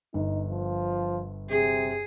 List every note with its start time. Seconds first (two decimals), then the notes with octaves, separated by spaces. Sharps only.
0.14 G1 D#4
0.50 F3
1.49 C3 G#4